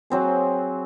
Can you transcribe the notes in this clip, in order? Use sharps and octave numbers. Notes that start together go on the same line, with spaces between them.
F#3 C4 G#4